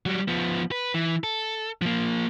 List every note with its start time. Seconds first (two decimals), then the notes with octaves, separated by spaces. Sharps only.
0.06 F#3 G3
0.28 F3 B3
0.71 B4
0.94 E3
1.24 A4
1.82 F3 A#3